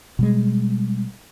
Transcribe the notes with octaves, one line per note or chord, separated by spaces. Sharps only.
B2 G3 G#3